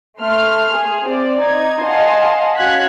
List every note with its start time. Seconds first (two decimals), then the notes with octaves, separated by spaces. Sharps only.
0.20 A3 C6 F6
0.72 G#4
1.04 C4 D5
1.41 D#4 G#6
1.83 D#5 F5 F#5 G#5 A5 C6
2.56 C#4 F#4 F5 F#6 G#6 B6